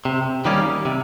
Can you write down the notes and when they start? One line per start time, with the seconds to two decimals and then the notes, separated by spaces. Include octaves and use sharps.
0.05 C3
0.45 D#3 G3 A#3 C#4
0.85 C3